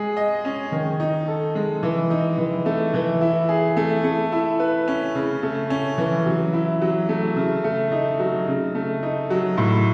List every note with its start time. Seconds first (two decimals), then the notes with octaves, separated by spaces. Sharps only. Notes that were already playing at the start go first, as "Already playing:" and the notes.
Already playing: G#3 G#4
0.17 D#5
0.45 C#4
0.72 D#3
1.00 D#4
1.28 A4
1.55 G#3
1.83 E3
2.10 D#4
2.38 E3
2.66 A3
2.94 E3
3.21 E4
3.49 G#4
3.77 A3
4.04 A3
4.32 E4
4.60 B4
4.88 C#4
5.15 C#3
5.43 A3
5.70 C#4
5.98 E3
6.26 F#3
6.53 E4
6.81 F#3
7.09 A3
7.36 C#3
7.64 A3
7.92 D#4
8.19 F#3
8.47 C#3
8.75 A3
9.03 D#4
9.30 F#3
9.58 A2